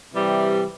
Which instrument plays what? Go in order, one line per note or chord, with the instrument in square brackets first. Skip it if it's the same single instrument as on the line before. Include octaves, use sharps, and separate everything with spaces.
[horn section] C3 E3 G3